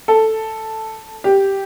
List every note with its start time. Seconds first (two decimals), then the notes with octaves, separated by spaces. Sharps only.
0.08 A4
1.24 G4